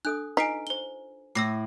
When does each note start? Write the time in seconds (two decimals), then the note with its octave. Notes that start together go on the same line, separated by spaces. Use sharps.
0.05 D4 A4 D#6 F#6
0.37 D#4 F4 B4 G#5 B6 C7 D7
0.67 C5 G7
1.35 A2 D6 E6 A#6 C7